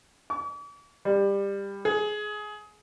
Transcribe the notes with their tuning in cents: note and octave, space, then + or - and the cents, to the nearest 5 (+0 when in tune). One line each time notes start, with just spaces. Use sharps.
D6 -45
G3 +20
G#4 +20